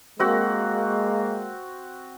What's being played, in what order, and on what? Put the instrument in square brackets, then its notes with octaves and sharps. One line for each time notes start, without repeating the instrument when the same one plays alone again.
[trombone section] G#3 A#3 [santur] C4 F#4